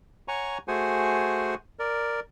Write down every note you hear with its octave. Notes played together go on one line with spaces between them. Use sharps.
C#5 F#5 G#5 A#5 C#6
A3 F#4 G#4 C5 F#5 G#5
A#4 D5